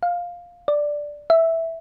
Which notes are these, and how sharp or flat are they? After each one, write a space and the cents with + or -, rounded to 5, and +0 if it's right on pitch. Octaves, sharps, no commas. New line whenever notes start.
F5 +5
D5 +0
E5 -5